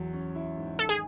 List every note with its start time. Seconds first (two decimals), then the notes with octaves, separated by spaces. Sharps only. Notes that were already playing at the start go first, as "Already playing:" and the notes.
Already playing: E2 F#3
0.13 C#4
0.36 E4
0.57 G#2
0.79 D#3 A4
0.89 G#4